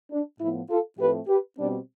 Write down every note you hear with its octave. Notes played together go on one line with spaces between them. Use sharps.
D4
A2 F3 B3 E4
F4 A4
A2 F3 A3 C4 G4 B4
G4 B4
B2 G3 C4 D4